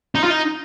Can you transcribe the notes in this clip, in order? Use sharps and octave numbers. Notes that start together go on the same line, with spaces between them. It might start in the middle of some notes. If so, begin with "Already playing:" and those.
D#4
F4
D#4